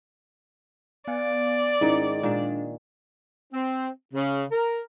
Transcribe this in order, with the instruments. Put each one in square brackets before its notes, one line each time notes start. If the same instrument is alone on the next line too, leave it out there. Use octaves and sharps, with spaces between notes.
[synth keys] B3 F5 G#5 [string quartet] D5
[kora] G#2 D#3 [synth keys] C#4 E4
[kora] A#2 [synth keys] G#3 D4
[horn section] C4
C#3
A#4